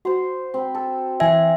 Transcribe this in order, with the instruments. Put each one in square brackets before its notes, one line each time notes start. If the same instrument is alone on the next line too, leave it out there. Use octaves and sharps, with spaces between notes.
[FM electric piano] F#4 [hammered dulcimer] C5 C6
[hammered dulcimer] C4 B5
A4
[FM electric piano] E3 G#5 G#6 [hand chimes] E5